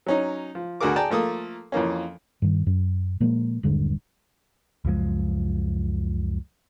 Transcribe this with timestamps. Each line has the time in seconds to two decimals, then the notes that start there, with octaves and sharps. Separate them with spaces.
0.06 F#3 C#4 D#4
0.55 F3
0.81 D2 D3 F#4 G#4 A#4 D6
0.96 G#4 D5 G5 A5 A#5
1.10 F3 A3 A#3 D#6
1.72 F2 E3 A#3 C#4
2.42 G2 D#3
2.67 F#2
3.20 A#2 F3 G#3 A#3
3.63 D#1 G2 D3 G#3
4.85 C#2 F#2 F3 G#3